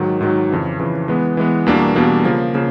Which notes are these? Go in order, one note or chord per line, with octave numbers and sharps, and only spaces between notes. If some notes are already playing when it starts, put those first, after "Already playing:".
Already playing: G#2 D#3 F#3
G#2 D#3 F#3
F2 C#3 E3
F2 C#3 E3
E3 G#3 B3
E3 G#3 B3
E2 B2 G3 A#3 D4
E2 B2 G3 A#3 D4
C#3 F3 A#3
C#3 F3 A#3